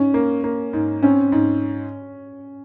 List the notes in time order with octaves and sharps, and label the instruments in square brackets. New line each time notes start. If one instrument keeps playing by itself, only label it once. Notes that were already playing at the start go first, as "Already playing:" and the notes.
Already playing: [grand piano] G#2 [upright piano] C#4
[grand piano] A#3
A#3
G#2
[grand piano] C4 [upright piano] C#4
[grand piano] G#2